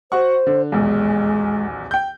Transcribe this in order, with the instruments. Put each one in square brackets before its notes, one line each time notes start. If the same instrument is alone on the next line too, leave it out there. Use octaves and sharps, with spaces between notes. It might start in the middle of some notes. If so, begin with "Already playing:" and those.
[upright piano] F#4 F#5 C#6 [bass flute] C5
[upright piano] D3
[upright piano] D#1 B1 E2 [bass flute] G#3
[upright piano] G5 G6